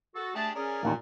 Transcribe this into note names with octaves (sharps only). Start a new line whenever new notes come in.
F#4 A4
A3 D4 G4 G#4 A5
C#4 G#4 A#4 D5
A1 D#2 A#2